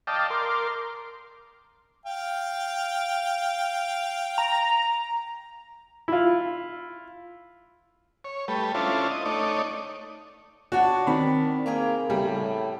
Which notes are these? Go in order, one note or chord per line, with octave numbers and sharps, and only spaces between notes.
D5 D#5 F5 G5 A5
A#4 C6 D6
F5 G5
A#5
E4 F4
C#5
G3 A3 B4
C#4 D4 E4 F4 A4 C5
D#5
A3 D#4 C#5 D5
D4 F#4 C#5
D#3 C4 B5
A#3 G#4 G5 A#5
A2 C#3 G3